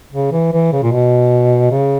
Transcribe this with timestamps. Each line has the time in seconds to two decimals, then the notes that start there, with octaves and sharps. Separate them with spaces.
0.13 C#3
0.32 E3
0.53 E3
0.72 C#3
0.82 A#2
0.92 B2
1.71 C#3